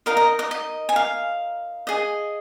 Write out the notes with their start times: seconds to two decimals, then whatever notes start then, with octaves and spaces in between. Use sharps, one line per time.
0.06 D#4 A#4 D#5 F5
0.17 D#5
0.39 D#5
0.51 D#5
0.89 G#5
0.96 F5
1.87 G#4 D#5